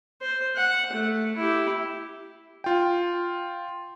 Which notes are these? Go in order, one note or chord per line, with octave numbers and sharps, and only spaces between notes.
C5
F#5
A3
E4 G4
F4 G5